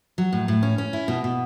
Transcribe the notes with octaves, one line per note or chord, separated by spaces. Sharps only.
F#3
A2
A2
C#4
C#4
E4
B2
B2